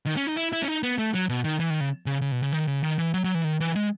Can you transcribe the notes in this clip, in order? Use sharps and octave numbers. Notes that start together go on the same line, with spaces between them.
D#3
C#4
D#4
E4
E4
C#4
D#4
B3
A3
F#3
B2
D#3
E3
D#3
C#3
C#3
C#3
B2
C#3
D#3
C#3
D#3
E3
F#3
F#3
E3
D#3
E3
G#3